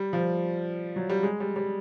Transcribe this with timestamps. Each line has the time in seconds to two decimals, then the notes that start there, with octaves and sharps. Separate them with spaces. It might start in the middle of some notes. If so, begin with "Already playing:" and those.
Already playing: G3
0.13 F3
0.96 F#3
1.10 G3
1.23 G#3
1.40 G3
1.56 G3